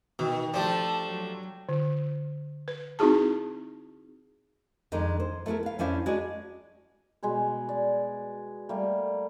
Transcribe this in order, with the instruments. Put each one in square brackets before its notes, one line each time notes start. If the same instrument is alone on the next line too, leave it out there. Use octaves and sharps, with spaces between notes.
[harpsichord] B2 [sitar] D#3
[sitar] F3 A3 [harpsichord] D4 G4 [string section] A5
[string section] F#3
[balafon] D3
B4
C4 D#4 E4 F#4 G#4 A5
[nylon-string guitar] F2 D#3 G#3 D4 D#4
C5
A3 B3 E4 G#4 A#4
B3 F5
F2 C#4 D4 E4 C5 F5
G#3 D4 F#4 G#4 D5
[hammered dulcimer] B2 G#3 G#4 B4
D5
G3 A3 A#3